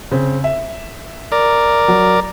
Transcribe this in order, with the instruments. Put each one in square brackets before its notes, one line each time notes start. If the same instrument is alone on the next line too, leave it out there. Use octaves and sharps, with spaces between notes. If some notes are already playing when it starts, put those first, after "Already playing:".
[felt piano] C#3 C4
E5
[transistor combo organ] A#4 D5
[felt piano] F#3